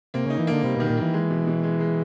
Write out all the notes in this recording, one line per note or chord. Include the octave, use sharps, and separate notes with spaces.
C3 A#3
C#3 D#4
E3
D3 A#3
C3 G3
B2 D#3
A#2
E3 A#3
G#3
B2
B2
G#3
G#3